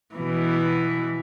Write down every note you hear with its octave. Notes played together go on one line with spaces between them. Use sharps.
B2 E3